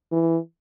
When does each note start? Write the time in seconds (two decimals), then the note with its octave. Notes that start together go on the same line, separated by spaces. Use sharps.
0.12 E3